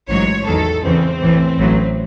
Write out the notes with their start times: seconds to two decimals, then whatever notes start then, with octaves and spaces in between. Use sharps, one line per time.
0.09 A1 G#2 F#3 C#5
0.46 E2 D#3 F#3 A4
0.84 E2 C#3 E3 C4
1.22 A1 A2 E3
1.59 A1 A2 F#3